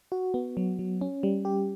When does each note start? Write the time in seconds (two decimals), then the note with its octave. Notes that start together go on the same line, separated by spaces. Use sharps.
0.12 F#4
0.34 B3
0.57 F#3
0.79 F#3
1.01 C#4
1.23 G3
1.45 G4